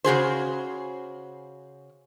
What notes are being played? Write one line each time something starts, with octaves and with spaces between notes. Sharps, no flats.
C#3 F#4 G#4 C5